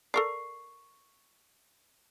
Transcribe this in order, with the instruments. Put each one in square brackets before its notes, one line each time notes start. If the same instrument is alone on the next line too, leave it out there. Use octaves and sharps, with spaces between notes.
[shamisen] A4 A#4 D5 [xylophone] C#6 C7